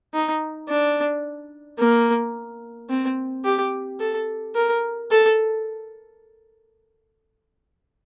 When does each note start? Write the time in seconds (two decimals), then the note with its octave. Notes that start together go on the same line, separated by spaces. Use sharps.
0.14 D#4
0.69 D4
1.79 A#3
2.90 C4
3.45 G4
4.00 A4
4.56 A#4
5.11 A4